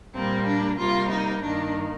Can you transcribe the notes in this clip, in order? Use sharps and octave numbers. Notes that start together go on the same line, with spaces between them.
A#2 G3 A#3 C4
D4
C3 G3 A#3 F4
D#4
G2 D#3 A#3 D4